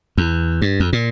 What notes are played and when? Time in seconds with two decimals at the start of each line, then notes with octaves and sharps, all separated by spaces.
0.18 E2
0.62 G2
0.80 F2
0.93 A#2